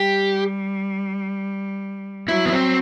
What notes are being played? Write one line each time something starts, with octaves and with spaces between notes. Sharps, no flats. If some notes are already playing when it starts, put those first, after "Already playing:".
Already playing: G3 G4
F#3 E4
B3
C4